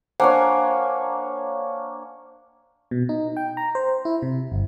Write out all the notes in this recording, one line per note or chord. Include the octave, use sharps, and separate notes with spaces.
A#3 D4 C5 C#5 F#5 G#5
B2
D#4
G5
A#5
C5
E4
C3
G1